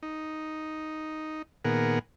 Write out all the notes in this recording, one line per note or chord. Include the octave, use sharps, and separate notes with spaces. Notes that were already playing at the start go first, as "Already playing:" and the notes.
D#4
A#2 D#3 B3 G#4 A#4 F#5